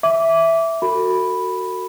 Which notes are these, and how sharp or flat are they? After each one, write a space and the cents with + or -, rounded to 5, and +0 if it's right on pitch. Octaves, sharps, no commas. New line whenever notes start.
E5 +0 D6 -20
F#4 +0 A4 +45 B5 +0